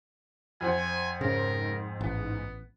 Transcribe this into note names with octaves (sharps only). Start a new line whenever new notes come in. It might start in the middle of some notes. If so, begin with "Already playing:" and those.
F2 C5 F#5 G#5
G#2 C#3 A#4
A1 B3